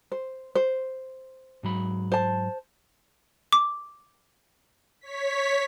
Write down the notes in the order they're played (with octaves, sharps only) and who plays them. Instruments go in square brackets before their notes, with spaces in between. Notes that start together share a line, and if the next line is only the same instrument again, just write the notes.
[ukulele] C5
C5
[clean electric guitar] G#2 F#3 B5
[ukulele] C5 A5
[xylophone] D6
[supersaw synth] C#5 B6